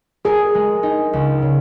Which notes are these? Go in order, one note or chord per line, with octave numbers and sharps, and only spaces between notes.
G#4 A#4
G#3
D#4
C#2
C#3